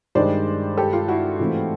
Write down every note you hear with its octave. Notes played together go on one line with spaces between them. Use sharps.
G2 D#3 G#3 C5 D5
G4 A4
F4 G4
E4 F#4
G#2 E3 A3 C4